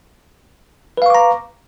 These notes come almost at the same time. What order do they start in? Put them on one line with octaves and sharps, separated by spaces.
B4 F5 C#6 D6 A#5